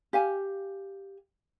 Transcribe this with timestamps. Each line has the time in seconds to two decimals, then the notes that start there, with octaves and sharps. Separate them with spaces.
0.13 G4 F5 G#5